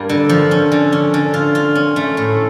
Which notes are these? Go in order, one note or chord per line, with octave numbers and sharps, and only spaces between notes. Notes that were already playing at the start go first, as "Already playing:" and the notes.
Already playing: G2 A#3
D3
F3
C#4
D3
C#4
D3
F4
F4
C#4
A3
A2